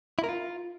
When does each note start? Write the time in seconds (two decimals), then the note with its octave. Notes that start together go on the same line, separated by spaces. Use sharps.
0.19 E4
0.24 A#4
0.29 F4